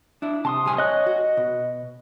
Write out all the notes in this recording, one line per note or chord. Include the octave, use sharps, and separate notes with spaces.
D4 E4
C3 A5 C6 D#6
C3 G3 G#5
C#5 D#5 F#6
F#4
B2